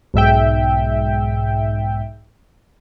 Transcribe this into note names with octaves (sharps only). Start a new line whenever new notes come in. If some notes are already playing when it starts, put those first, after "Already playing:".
B1 G#2 E5 G5